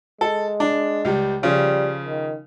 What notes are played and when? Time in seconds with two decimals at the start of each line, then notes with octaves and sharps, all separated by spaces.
0.21 G#3 A4
0.60 D4
1.05 C#2 G3
1.43 C#3 F3 G3
2.06 D#3